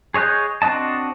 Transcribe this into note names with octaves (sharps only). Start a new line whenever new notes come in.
G#4 C#5 D#5 F#6 G6
C4 D4 F#4 D#5 A5